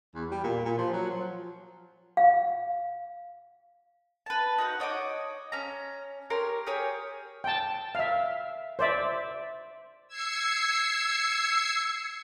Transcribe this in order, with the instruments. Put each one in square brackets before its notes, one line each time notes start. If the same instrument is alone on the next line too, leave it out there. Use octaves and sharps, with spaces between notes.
[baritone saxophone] E2
G3
A#2
A#2
F3
F#3
F3
[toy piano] F5
[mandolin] B4 A5
D#4 F#4 F#5
C#5 D#5 A5 D6
C#4 A#5
G4 A#4 C#5 C6
G4 G#4 A#4 C#5
[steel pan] G5 A5
E5 F5
C5 D5 E5
[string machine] E6 G#6 C7 C#7